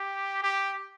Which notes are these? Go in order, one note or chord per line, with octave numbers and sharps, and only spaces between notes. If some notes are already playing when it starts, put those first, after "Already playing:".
Already playing: G4
G4